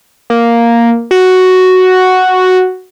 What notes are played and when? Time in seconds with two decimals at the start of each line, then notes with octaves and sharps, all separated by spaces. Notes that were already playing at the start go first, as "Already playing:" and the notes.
0.30 A#3
1.11 F#4